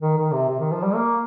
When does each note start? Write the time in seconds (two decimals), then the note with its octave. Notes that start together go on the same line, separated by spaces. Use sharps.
0.02 D#3
0.18 D#3
0.33 C3
0.49 C3
0.60 D#3
0.71 F3
0.83 G3
0.95 A#3